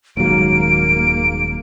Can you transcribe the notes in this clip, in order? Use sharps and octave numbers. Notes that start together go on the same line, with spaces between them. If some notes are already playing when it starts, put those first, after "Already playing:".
D#1 D#2 G#2 F#3 A#3 D7